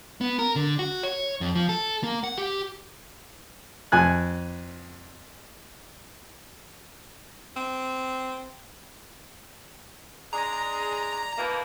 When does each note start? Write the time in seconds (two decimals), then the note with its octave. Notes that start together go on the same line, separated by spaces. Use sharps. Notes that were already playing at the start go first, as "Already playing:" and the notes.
0.21 B3
0.39 A#4
0.56 D3
0.79 F#4
1.03 C#5
1.41 F2
1.55 F3
1.69 A4
2.04 A#3
2.24 F#5
2.38 G4
3.92 F2 G#5 F#6
7.56 C4
10.33 G#3 D4 G#4 A#5
11.37 B2 E3 A#3